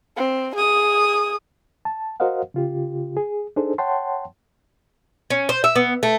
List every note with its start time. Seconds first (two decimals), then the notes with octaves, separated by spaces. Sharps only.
0.17 C4
0.55 G#4 D#6
1.85 A5
2.20 F#4 A#4 C5 D#5 F5 F#5
2.54 C#3 F4 G4
3.17 G#4
3.56 D4 D#4 G#4 A4 C5
3.78 C#5 F#5 G5 A5 C6
5.30 C#4
5.49 C5
5.64 E5
5.76 B3
6.03 A3